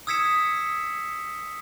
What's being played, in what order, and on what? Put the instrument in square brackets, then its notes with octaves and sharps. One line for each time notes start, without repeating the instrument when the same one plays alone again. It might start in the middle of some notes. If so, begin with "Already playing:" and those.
[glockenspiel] D#6 E6 G#6 B6 C#7 E7